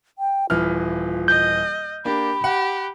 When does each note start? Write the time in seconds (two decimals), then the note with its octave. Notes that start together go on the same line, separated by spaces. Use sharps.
0.19 G5
0.50 D#1 E3 F4 F6
1.28 D#5 G6
2.05 A#3 D4 G4 B5
2.44 G4 F#5